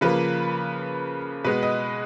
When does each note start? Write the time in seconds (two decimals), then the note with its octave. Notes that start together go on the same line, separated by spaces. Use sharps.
0.01 C#3 F3 A#3 B4
1.44 B2 G#3 B3 B4
1.63 D#5